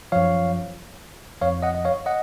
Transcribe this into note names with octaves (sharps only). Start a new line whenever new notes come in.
F#2 F3 C#5 F5
F2 F3 C#5 F5
D#5 F#5
D#5
C#5 F5
D#5 F#5